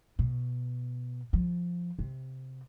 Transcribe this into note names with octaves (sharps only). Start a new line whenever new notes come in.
B2
F3
C3